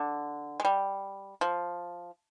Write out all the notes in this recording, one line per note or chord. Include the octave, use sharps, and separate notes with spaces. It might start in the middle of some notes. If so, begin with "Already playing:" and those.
Already playing: D3
G#3
G3
F3